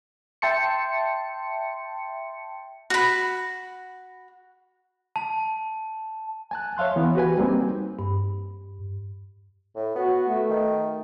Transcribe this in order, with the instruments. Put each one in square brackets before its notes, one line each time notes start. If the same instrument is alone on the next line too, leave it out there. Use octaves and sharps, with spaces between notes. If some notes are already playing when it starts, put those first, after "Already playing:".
[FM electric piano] E5 G5 A5 C6 C#7
[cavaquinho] F#4 B5
[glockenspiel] A5
[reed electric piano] G#5 A5 F#6
C#5 E5 F5 C6 F#6
E3 B3
F#4 G4 B4 G#5
G3 A#3 C4 D#4
[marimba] G2
[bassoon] A2
[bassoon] B3 [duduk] F#4
[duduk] A3
[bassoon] D#3